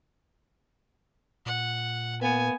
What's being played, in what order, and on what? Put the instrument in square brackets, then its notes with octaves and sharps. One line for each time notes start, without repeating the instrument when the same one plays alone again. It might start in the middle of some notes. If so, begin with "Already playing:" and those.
[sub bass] A#2 [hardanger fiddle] F#5
[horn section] A#3 B3 [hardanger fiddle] G#5